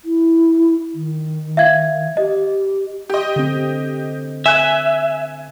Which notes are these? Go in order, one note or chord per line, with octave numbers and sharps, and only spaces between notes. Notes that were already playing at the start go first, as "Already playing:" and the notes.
E4
D#3
E5 F5 G#6
G4 D#5
G4 D#5
D3 C4
E5 G#5 F#6